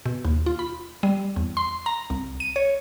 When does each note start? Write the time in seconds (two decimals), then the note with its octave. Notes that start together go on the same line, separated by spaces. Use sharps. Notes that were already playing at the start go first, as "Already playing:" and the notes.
0.06 B2
0.25 D#2
0.46 F4
0.59 B5
1.03 G3
1.36 E2
1.57 C6
1.86 A#5
2.10 C2
2.40 D#7
2.56 C#5